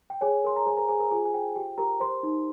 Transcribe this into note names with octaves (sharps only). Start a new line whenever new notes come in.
G5
G#4 C#5 G#5
A#4 C6
A#5
G#4 C5 G#5
A#4 A#5
G#4 C5 G#5
A#4 A#5
F4 G#4 G#5
G#5
C5 G5
G4 G5
G4 A#4 A#5
A#4 C5 C6
D#4